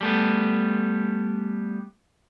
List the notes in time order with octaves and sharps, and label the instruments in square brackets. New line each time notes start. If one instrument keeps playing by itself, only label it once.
[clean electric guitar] G3 A3 B3